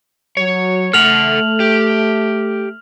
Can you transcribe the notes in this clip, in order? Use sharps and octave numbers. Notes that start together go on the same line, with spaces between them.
F#3 C#5
A3 A4 F#5 F6 F7 F#7
G4